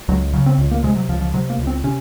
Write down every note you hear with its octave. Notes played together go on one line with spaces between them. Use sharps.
C#2 F#3
C#3 F#3
C4
C#2
A#3
C3 G#3
F#3
C#2 F3
F3
C3 F#3
A#3
C#2
C4
C3 C#4